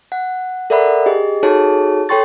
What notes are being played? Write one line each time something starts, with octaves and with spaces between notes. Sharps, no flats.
F#5
A4 A#4 D5 E5 F#5 B5
G4 G#4 D#5
D#4 F#4 G#4 A4 C#5 A5
A4 C#5 G5 C6 C#6 A6